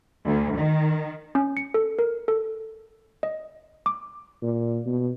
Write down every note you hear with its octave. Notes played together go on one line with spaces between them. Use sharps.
D2
D#3
C#4
C#7
A4
A#4
A4
D#5
D6
A#2
B2